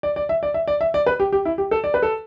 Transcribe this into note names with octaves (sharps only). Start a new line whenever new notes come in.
D5
D5
E5
D5
E5
D5
E5
D5
B4
G4
G4
E4
G4
A4
D5
B4
A4